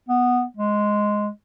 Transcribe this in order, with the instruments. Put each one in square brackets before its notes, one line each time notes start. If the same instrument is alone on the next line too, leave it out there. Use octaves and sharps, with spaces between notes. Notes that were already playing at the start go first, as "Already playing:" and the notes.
[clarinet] B3
G#3